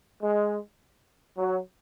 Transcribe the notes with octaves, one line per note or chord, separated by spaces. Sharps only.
G#3
F#3